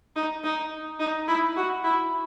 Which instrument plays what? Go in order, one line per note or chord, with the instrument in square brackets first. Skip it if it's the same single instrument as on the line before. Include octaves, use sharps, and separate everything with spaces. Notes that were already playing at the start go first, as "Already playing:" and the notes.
[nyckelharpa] D#4
D#4
D#4
E4
F#4
E4